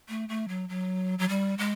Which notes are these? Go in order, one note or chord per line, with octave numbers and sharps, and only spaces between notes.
A3
A3
F#3
F#3
F#3
G3
G#3